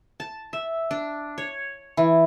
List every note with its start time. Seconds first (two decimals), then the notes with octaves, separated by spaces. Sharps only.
0.20 A5
0.53 E5
0.91 D4
1.38 C#5
1.97 E3